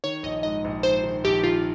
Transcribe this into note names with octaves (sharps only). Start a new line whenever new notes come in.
D#3 C#5
A#1 D#5
G#2 D#5
A#1
G#2 C5
D#3
A#1 G4
D#3 F4